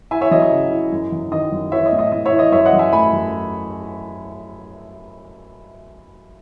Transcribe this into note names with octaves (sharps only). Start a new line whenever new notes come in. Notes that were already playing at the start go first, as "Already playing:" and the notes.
E4 E5 G#5
C#5 E5
F#3 D#5
D#5
C#3
E4
F#2
F#3
D#3 D#5
F#2
E3 C#5 E5
D#5
A2
D#5
A2 D#5
C#5 E5
E3
D#5
F#2 C#5 E5
D#5 F#5
F#2
E5 G#5
A3 G#5 B5
F#2